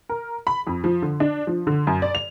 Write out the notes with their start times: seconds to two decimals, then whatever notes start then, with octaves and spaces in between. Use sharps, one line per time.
0.09 A#4
0.47 B5
0.67 F2
0.84 F3
1.02 D3
1.20 D4
1.47 F3
1.67 D3
1.87 F#2
2.02 D5
2.15 F7